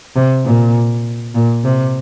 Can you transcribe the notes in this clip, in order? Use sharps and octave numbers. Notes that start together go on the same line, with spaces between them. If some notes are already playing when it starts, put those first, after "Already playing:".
C3
A#2
A#2
C3